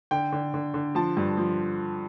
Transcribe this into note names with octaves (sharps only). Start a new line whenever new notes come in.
D3 G5
D3
D3
D3
F3 A5
G2
F3